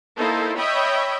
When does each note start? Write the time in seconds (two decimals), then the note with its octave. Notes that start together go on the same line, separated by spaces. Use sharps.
0.16 A#3 D#4 E4 A4 C5
0.57 C#5 D#5 E5 G5 B5